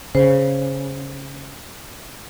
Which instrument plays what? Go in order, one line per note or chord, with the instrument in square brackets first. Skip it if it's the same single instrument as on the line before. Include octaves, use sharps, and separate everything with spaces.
[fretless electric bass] C#3 [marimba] C5